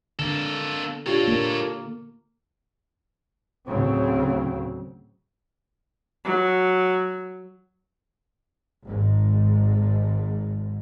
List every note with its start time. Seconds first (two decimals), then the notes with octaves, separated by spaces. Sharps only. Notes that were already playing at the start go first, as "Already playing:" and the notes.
0.19 D3 A#3 A4
1.07 D4 F4 G4 A4 C#5
1.28 A#3
3.67 D2 A2 C#3 F#3 C4
6.25 F#3
8.84 G#1 G#2